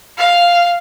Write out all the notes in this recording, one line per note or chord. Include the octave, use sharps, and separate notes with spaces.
F5